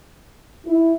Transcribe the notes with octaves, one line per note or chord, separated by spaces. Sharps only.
E4